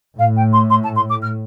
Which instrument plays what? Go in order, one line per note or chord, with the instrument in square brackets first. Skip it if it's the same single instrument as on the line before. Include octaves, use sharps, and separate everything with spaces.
[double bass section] A2 [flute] F5
[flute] G5
C6
C6
A5
C6
D6
F6